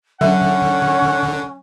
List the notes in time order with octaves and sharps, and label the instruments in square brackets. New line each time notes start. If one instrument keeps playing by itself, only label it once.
[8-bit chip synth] D3 [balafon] F#3 E5 [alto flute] C#4 [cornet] F#5